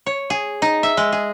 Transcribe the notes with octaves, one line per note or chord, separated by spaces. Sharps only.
C#5
G#4
D#4
E5
G#3
G#4